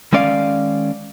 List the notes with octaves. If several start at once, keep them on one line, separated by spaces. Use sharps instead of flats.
D#3 G#3 C#4 D5 E5 F5